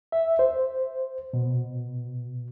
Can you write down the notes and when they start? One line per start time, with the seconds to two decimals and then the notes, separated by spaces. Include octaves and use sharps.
0.12 E5
0.39 C5
1.33 B2